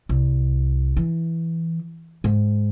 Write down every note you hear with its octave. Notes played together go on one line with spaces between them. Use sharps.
C2
E3
G#2